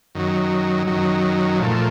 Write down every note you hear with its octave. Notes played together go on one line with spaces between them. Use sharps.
F#2 D#3 F#3
F#2 D#3 F#3
A#2 F3 A3